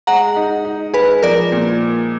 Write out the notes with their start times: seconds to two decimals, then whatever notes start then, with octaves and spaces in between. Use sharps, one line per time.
0.07 G#3 F#5 A#5
0.36 D#4
0.65 D#4
0.94 G#3 G#4 B4
1.23 F3 A#4 D5
1.52 A#2